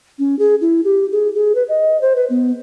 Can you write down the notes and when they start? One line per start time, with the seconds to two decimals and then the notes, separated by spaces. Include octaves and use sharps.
0.19 C#4
0.39 G#4
0.61 E4
0.85 G4
1.12 G#4
1.35 G#4
1.55 B4
1.69 D#5
2.02 C5
2.16 B4
2.30 B3